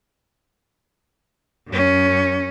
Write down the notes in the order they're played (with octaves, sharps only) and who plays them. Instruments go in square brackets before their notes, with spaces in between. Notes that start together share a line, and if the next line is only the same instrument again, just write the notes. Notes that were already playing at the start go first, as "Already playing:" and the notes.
[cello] F#2 C#4